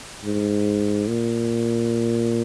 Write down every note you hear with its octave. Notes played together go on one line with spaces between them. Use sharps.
G#2
A#2